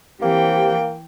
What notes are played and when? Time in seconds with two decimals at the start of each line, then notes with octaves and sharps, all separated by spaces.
0.22 E3 A#3 C4 G4 G5